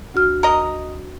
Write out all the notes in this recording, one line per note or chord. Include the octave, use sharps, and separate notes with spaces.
D2 F#4 F6
A#4 D#5